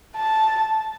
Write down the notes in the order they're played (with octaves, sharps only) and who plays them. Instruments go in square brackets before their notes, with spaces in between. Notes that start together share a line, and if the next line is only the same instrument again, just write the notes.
[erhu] A5